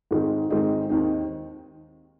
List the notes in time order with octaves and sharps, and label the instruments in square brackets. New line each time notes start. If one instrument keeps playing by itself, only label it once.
[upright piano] G#2 D#3 G#3 C4 D#4
G#2 D#3 G#3 C4 D#4
D#2 D#3 C4 D#4